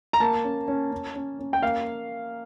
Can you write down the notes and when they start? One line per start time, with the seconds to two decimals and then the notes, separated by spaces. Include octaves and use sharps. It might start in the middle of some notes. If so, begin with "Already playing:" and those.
0.13 A#5
0.20 A#3 A5
0.44 C#4
0.68 C#4
0.91 C#4
1.15 C#4
1.39 C#4
1.53 G5
1.62 A#3 F5